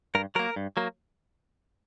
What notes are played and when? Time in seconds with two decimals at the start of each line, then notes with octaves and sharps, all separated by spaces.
0.15 G2 A#4
0.35 F#3 A#3 A#4
0.56 G2
0.77 F#3 A#3